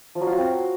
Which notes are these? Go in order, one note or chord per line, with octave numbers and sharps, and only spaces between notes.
F3
F#3
F4
F#4
C4